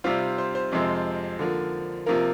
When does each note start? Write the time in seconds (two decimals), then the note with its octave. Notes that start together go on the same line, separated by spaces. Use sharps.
0.04 C3 G3 C4 F4
0.38 C5
0.55 C5
0.72 F2 C3 F3 G#3 C4
1.39 D3 F3 A#3
2.06 C3 F3 A#3 A#4